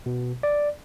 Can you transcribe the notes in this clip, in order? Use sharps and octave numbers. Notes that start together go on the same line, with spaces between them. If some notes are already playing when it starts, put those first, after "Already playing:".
B2
D5